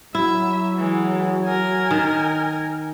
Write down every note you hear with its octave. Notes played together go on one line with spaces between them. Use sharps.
F#3 E4 E5
E3 G#3
A#4 G#5
D#3